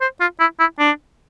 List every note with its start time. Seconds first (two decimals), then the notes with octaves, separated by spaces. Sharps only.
0.01 C5
0.20 F4
0.40 E4
0.59 E4
0.79 D4